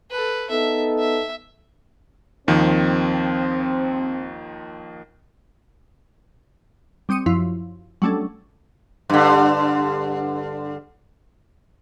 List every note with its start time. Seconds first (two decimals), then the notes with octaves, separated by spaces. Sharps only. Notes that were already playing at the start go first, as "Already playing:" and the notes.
0.11 A4 B4
0.50 B3 D#4 A4 E5
0.99 E5
2.48 D#2 D#3 F3 C4
7.09 G3 C4 D#6 C#7 D#7
7.26 F#2 F3 E4
8.02 F#3 G3 A3 C#4 D4 A4
9.10 G2 D3